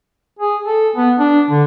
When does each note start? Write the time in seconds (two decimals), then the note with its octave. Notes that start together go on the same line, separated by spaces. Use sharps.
0.39 G#4
0.65 A4
0.96 B3
1.19 D4
1.50 D3